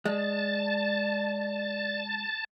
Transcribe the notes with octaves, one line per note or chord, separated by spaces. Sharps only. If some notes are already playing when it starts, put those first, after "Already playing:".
G#3 D5 A5